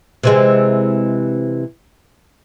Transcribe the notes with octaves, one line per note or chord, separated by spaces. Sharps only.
C3 E3 G#3